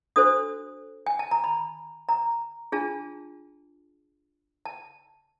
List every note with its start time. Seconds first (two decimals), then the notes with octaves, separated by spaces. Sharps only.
0.16 D4 F#4 A4 C5 D#6
1.06 G#5
1.19 A5
1.31 A#5
1.44 B5
2.09 A#5
2.72 D4 F4 G#4 A5
4.65 A5